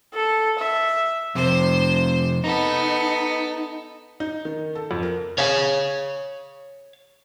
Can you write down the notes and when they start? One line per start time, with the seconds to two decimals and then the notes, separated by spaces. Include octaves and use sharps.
0.14 A4
0.58 E5
1.35 F2 C3 C5
2.44 B3 D#4 A4
4.20 D#4
4.45 D#3
4.75 A4
4.91 F2
5.03 A#4
5.38 C#5 F5